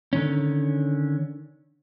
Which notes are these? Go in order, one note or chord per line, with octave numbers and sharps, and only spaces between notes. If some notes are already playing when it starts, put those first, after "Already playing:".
D3 D#3 C#4